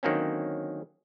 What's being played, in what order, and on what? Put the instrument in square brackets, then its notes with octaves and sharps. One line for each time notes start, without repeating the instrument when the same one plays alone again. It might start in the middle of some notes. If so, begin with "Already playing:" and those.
[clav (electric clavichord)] D3 D#3 F#3 A#3 C4 C#4